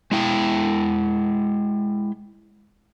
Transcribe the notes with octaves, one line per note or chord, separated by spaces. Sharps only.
G#3 E4 G5